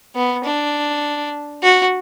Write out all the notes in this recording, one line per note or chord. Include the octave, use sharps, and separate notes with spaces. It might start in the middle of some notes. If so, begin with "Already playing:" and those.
B3
D4
F#4